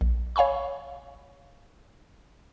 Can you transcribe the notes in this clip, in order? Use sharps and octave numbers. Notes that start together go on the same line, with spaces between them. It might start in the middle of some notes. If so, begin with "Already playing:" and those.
A#1
C#5 F5 G#5 B5 C#6